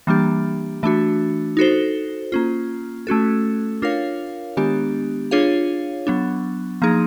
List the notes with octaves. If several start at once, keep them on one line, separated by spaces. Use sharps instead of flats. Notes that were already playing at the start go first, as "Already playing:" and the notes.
E3 G3 A#3 D4 G4
E3 A3 D4 F#4
D#4 F#4 A4 C5
A#3 C#4 F4
A3 C#4 F#4 A4
D4 F4 A#4 C#5 F5
D#3 G#3 B3 D4 G4
D4 F4 G#4 C#5 F5
F#3 B3 D4
F3 A#3 D#4 G#4